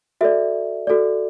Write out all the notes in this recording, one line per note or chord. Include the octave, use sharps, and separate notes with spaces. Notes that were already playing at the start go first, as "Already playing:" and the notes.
F#4 A4 D5 E5
F#4 A4 D5